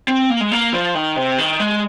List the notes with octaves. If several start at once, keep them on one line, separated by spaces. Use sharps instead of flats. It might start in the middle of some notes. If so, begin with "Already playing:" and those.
C4
A#3
G#3
A#3
F3
D#3
C3
D#3
G#3